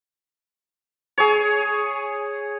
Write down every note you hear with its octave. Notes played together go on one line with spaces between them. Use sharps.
G#4 C#5